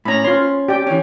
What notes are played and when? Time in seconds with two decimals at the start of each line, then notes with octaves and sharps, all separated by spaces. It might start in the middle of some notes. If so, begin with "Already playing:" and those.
0.05 A2 C#4 A#5 B5
0.24 C#4 F4 C6
0.68 G4 D5 G5
0.87 E3 C#4